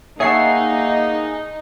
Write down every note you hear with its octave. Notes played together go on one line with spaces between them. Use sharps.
A#3 D#4 G#4 C#5 E5 F#5 A5 C7